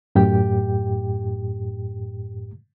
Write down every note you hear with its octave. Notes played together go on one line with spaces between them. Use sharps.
F#2 A2 G4 G5